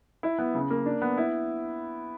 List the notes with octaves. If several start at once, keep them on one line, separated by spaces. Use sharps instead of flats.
E4
B3
C#3
A#3
D4
B3
E4